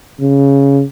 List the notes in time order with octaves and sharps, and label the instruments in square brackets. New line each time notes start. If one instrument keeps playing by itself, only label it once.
[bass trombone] C#3